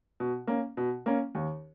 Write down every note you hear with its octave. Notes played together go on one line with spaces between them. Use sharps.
B2
A#3 C#4
B2
A#3 C#4
D#2